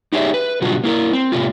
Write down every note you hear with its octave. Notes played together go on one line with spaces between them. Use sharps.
D#4 G4 G#4 C#5 D5 E5
B4
B2 D3 F#3 G3 F4 F#4
A#3 E4 A#4
C4
A2 C3 A3 F4